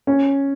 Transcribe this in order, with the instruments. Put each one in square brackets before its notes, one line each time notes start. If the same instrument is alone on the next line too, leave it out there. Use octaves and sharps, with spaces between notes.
[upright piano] C#4